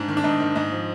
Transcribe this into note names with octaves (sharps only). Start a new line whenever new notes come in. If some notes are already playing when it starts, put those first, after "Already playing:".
Already playing: G#2 D4
D#3
D4
G#2 D#4
D#3 D#4
G#2 D#4
F3